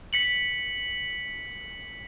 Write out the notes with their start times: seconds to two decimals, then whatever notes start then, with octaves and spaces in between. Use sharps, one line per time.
0.13 B6 C#7 F#7